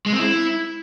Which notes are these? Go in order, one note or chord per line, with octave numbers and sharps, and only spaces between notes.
G#3
C4
E4